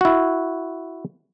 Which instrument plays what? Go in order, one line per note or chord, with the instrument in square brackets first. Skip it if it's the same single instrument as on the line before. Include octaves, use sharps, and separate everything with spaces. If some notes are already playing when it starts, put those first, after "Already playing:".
[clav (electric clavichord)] E4 F#4